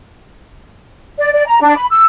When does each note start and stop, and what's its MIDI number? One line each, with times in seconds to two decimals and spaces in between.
1.18 1.32 74
1.33 1.45 74
1.46 1.58 82
1.61 1.74 62
1.76 1.85 83
1.91 2.05 88